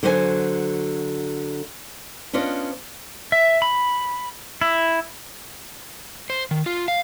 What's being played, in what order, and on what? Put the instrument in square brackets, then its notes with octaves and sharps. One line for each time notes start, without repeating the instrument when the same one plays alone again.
[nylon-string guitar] D3 F#3 F#4 C5 D5 G#5
B3 C#4 D4 F4 D5 D#5
[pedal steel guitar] E5
B5
E4
[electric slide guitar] C5
D#3
F4
F5